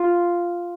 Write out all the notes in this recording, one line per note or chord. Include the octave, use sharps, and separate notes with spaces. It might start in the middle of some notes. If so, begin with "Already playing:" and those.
Already playing: F4